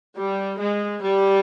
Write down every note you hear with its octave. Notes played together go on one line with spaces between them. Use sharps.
G3
G#3
G3